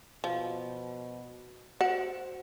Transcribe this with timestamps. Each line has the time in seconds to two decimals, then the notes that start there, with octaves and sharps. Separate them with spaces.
0.24 B2 F3
1.81 F#4 C5 F#5